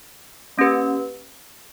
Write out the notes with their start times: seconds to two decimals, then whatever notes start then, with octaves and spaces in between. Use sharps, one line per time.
0.58 A#3 C#4 G4 B4